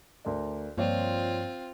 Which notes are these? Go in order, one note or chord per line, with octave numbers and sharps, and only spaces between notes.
D2 A#4 D5
G2 F3 A#3 C4 F4 C#5 D5